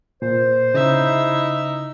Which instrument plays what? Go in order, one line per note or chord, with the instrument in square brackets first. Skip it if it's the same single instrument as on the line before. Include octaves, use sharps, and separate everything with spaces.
[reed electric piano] A#2 [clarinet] C5
[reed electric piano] C#3 [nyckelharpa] D#4 E5 [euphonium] E4